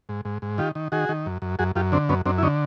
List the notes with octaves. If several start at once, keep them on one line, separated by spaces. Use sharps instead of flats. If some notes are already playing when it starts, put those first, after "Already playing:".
G#2
G#2
G#2
D#3 F4 G4
D#3
D#3 F#4 G#4
D#3
F#2
F#2
F#2 F#4 G#4
F#2 F4 G4
D3 C4 D4
F#2 B3 C#4
F#2 C4 D4
E4
D3 C#4 D#4